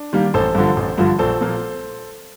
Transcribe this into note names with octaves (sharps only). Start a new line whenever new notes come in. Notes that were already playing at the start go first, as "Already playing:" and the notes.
Already playing: D4
D#3 G3 A#3
A1 A4 C5
G2 D3 F3
A1
G2 D3 F3
A#1 A4 C5
A#2 F3 A#3